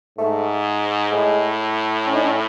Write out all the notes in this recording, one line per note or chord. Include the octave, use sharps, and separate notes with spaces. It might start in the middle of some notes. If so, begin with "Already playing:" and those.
G#2 A3
A2 G#3
C#4
D#4
C#4